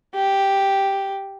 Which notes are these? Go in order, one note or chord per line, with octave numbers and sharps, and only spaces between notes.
G4